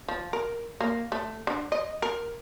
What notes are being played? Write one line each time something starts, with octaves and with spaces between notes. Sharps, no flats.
F3
A#4
A#3
A3
D3
D#5
A#4